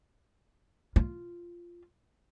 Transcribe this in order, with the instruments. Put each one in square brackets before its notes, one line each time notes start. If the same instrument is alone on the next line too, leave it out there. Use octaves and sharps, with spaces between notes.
[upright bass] F4